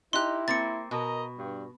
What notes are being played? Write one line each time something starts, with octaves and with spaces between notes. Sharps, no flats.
D#4 E4 G4 C6 F#6
A#3 C4 A6 C#7
B2 A#4 D#5 A#5
G2